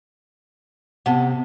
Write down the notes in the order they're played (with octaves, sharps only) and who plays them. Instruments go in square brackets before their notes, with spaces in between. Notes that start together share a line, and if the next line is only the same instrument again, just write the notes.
[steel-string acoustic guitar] C3 [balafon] B3 F#5